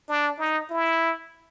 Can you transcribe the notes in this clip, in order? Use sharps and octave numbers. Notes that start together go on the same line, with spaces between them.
D4
D#4
E4